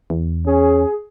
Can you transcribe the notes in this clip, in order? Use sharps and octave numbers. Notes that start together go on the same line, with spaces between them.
E2
C#4 G#4